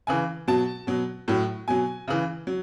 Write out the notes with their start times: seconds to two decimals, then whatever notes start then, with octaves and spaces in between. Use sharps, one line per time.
0.07 C#3 E3 G#5
0.48 B2 F#3 A5
0.87 B2 F#3
1.28 A2 F#3
1.68 B2 F#3 G#5
2.08 C#3 E3
2.47 F#3